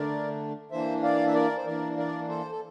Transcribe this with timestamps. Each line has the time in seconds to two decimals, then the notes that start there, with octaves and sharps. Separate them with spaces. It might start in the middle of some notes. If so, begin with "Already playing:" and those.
Already playing: D3 A3 D4 A#4 D5
0.71 E3 A#3 D4 C5 E5
1.03 D5 F5
1.27 E5
1.34 A#4 D5
1.57 C5
1.66 E3 A#3 D4 A#4 D5
1.98 A#4 D5
2.29 A4 C5
2.51 A4